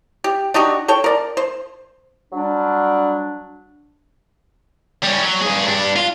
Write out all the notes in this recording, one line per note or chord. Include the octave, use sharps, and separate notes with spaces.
G4
D4 D#4 F#4 G4
A4 C#5 G5
A#4 D5
C5
F#3 G3 D4
G3 C#4
F#3
G2 G#4
G2 D4
F4